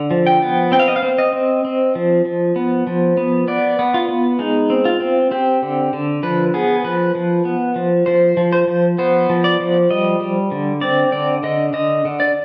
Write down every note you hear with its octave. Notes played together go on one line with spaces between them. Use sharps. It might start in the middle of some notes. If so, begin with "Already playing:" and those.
Already playing: D3
F3
G5
B3
C4 G5
F5
D#5
F5
C4
D#5
C4
C4
F3
F3
B3
F3
B3
B3 D5
B3
F4
B3
G#3 D#4
C4
F4
C4
C4 G4
D3
D3
F3 B4
B3 G#4
F3 B4
F3
B3
F3
F3 C5
F3
C5
F3
B3 C5
F3
D5
F3
G3 D#5
G3
D3
C4 D5
D3 D5
D3 D#5
D3 D#5
D3
D5